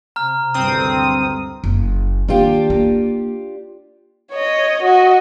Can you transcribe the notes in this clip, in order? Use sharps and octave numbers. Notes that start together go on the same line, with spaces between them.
C3 A#5 F6
G#1 D2 G2 C4 D#6
F#1
D#3 A#3 D4 F4 G4
A#3
C#5 D#5
F#4 D#5